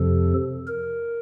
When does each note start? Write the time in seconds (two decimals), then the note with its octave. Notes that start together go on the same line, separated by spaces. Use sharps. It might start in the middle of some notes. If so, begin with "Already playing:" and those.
Already playing: F2 C3 F3 A4
0.68 A#4